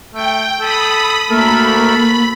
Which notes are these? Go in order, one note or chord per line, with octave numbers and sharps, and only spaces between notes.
A3 G5
A4 B5 D#6
D2 A3 A#3 A4 A#4 B5